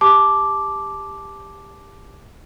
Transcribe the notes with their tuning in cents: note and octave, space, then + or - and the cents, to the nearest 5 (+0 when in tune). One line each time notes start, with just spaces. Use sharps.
G4 +20 A5 -15 D6 +0